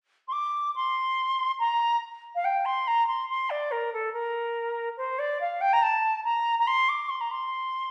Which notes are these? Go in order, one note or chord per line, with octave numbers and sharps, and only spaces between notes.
C6
D6
C6
A#5
F5
G5
C6
A#5
C6
C6
D5
A#4
A4
A#4
C5
D5
F5
G5
A#5
A5
A#5
A#5
C6
D6
C6
A#5
C6